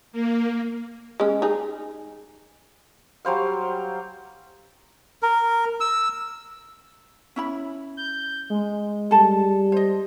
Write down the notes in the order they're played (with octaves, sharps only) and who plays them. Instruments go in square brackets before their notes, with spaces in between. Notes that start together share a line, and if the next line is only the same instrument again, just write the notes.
[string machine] A#3
[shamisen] G#3 C#4
D#4 G#4
[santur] F#3 G3 C5 F5
[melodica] A#4
E6
[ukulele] C#4 E4 B5
[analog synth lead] G6
G#3
[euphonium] G3 [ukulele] A4 A5
[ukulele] C5 D#5